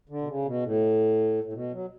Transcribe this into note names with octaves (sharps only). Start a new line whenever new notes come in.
D3
B2
C#3
B2
A2
A2
B2
F#3